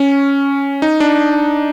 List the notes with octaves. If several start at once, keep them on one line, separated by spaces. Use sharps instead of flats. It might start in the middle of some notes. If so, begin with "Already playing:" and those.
Already playing: C#4
D#4
D4